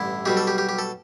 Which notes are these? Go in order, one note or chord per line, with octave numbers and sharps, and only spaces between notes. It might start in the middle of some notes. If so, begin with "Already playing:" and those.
Already playing: A1 G2 D3 E4
B1 B2 G3 G4
A4
G4
G4
G4
A4